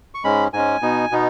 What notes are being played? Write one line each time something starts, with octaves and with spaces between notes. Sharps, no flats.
C#6
G#2 G#3 C#4 B5
G#2 G#3 C#4 G#5
B2 B3 D#4
B2 B3 D#4